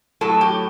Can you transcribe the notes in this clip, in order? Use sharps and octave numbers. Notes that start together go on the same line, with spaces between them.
A2 F#3 A4
G4